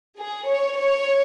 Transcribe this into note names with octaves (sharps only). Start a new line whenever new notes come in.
G#4
C#5
C#5